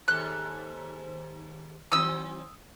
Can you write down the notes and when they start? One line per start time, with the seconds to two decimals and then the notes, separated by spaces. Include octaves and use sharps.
0.08 D#2 G#2 A4 F#6
1.92 D#3 F#3 C4 D#6 E6